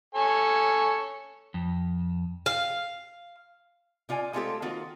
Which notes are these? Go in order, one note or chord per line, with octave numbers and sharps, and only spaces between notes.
A4 C#5 G#5
F2
F5
C3 F4 D5 G#5
G#3 A3 C4 F4 G4 A4
D#3 A#3 C4 F4 F#4